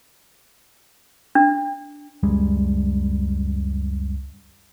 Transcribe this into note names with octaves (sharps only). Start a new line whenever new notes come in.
D4
C#2 F#2 G3 G#3